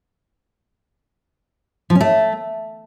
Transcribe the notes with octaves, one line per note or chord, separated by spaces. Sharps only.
F3
C#4
A3